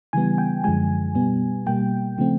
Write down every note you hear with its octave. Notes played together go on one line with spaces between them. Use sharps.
C#3 E3 G3 B3 G#5
G5
F#2 D3 F3 G#3 G#5
B2 G3 B3
B2 G3 A#3 G5
C#3 F3 A3 C4